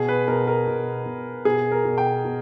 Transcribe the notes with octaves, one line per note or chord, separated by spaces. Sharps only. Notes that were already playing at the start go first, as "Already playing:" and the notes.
Already playing: B2 G#4
B4
B2 A#4
A#4
B2
B2
B2 G#4
A#4
B2
G5
B2